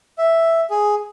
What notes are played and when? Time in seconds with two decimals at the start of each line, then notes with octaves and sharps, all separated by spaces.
0.18 E5
0.70 G#4